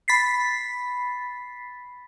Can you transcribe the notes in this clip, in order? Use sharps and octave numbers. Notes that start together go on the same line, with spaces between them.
B5 A6 B6 C7